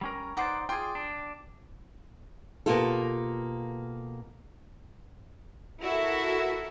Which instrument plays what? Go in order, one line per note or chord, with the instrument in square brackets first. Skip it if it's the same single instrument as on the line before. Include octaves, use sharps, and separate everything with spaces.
[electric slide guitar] G3 C#4 A#4
[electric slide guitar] D#4 C5 D5 [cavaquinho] B4 F#5 D6
[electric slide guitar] F4 G#4 [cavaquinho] D5 [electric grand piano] G5 C6
[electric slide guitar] D4
[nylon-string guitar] B2 A#3 B3 F4 G4 A4
[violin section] E4 F#4 A4 A#4 E5